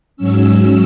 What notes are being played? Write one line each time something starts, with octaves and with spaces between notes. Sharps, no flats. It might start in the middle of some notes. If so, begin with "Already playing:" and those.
G#2 F#3 C#4 E6